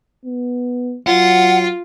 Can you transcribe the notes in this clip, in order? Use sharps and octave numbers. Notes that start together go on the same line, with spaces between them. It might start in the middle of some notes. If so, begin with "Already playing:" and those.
B3
F#3 F4 F#5